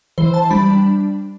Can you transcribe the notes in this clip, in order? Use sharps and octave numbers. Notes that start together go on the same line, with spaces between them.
E3 C5
A5
G3 D4 B5